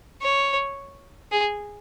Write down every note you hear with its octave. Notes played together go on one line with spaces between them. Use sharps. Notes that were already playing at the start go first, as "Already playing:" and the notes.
C#5
G#4